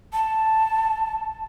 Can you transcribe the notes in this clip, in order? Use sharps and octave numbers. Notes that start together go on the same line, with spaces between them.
A5